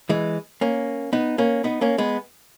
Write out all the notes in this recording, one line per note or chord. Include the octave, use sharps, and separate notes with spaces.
E3 G#3
A#3 C#4
B3 D#4
A#3 C#4
B3 D#4
A#3 C#4
G#3 B3